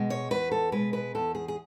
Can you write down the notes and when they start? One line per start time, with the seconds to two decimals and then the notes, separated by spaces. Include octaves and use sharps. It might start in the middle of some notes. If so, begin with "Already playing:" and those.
Already playing: B2 G#3
0.10 C#5
0.31 E2 B4
0.51 A4
0.72 B2 G#3 B4
0.93 B4
1.15 E2 A4
1.35 G#4
1.48 G#4